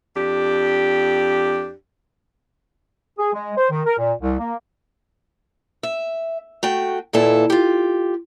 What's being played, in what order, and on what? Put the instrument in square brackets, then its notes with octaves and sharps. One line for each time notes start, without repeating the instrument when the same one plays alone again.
[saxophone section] F2 D4 G4
[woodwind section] G#4
G#3
C5
D#3
A#4
A#2
C2
A#3
[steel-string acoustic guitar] E5
A3 F#4 G5
D#2 A#2 E4 A4 B4
F4 G4